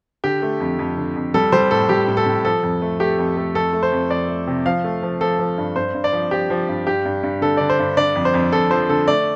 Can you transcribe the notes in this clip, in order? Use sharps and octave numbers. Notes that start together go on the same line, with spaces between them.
D3 G4
A3
F2
F2
D3
F2
G3 A4
G3 C5
A2 A4
G3 G4
A2
A4
A2
F3 A4
F2
A3
A3 G4
F2
A3
F2 A4
A3
C5
F2
F2 D5
A3
C3
F3 F5
A3
F3
F3 A4
F3
G2
G2 C5
G2
D5
F3
F3 G4
F3
G2
G2 G4
G2
G2
D3 A4
D3 D5
C5
G2
D3 D5
F2
C5
F2
F2 A4
F3 C5
D3 A4
A3 D5